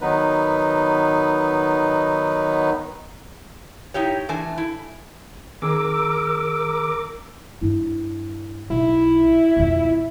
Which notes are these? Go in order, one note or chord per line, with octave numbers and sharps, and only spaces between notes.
D#3 F#3 B3 D#4 B4
D#4 E4 G4 C#5
E3 A3 D4 G#5
E4
D#3 C4 G#4 A#4 D6 E6
G2 E4
B1 E4
F2 B2